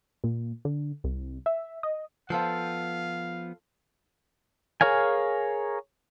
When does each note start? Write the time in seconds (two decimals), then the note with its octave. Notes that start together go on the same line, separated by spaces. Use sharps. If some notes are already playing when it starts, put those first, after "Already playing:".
0.24 A#2
0.65 D3
1.04 C2
1.46 E5
1.83 D#5
2.30 F3 B3 F4 A4 C5 F5
4.81 G#4 A#4 C#5 F5 G#5